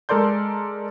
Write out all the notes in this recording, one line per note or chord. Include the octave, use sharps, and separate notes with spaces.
G#3 A4 A#4 D5 C6 G6